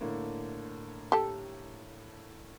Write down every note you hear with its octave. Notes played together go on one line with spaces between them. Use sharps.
A2 D3 A#3
G4 A4